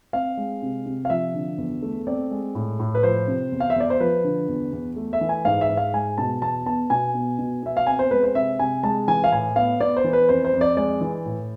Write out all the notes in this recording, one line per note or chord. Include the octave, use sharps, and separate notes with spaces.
C4 F5
G#3
C3
C3
F5
F3 E5
D3
E2
A3
C4 D5
G#3
A2
A2
B4
F3 C5
C3
E2
F5
E5
E2 D5
C5
F3 B4
D3
E2
E2
A3
E5
E3
G#5
G#2 F5
E5
G#2
F5
G#3 G#5
B2 A5
E2 A5
B3 A5
B2 G#5
B3
B2
B3 E5
F5
C4 G#5
C5
G#3 B4
C5
C3 E5
C3 G#5
G#3 A5
E3 G#5
F5
A2 G#5
B3 F5
B3 D5
C5
E3
B4
F2 C5
C5
F2
D5
G#3 D5
E3
A2